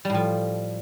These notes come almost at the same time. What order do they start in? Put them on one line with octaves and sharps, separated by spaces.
G3 A2 F3